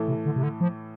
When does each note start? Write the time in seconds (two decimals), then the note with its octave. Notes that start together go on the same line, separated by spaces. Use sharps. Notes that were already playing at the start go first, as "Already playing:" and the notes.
Already playing: A2 E3 A3
0.08 C3
0.26 D3
0.36 C3
0.43 D3
0.61 F3